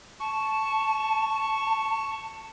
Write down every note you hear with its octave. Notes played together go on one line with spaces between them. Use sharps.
A5 C#6